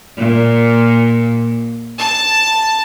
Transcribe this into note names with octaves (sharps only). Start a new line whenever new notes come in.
A#2
A5